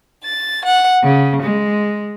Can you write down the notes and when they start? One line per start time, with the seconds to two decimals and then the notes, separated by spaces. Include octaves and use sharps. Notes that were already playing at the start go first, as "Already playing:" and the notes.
0.24 A6
0.65 F#5
1.02 C#3
1.41 G#3